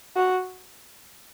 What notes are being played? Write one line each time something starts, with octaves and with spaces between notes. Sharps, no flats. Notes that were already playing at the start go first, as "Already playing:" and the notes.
F#4